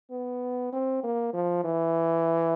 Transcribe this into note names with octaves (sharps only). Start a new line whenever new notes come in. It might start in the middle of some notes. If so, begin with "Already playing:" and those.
B3
C4
A#3
F3
E3